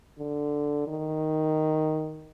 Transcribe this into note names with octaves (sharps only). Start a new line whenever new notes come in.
D3
D#3